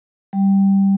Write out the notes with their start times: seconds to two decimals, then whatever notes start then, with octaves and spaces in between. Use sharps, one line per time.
0.33 G3